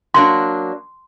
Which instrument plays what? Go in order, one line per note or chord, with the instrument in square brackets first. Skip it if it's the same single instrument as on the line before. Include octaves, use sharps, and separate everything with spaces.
[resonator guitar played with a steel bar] F#3 A#3 D4 [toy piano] C6